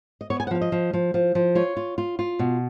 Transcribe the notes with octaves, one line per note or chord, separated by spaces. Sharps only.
D#5
B3 C#5
G#5
F#5
F3 F5
D#5
F3
F3
F3
F3
F4 C#5
F4
F4
F4
B2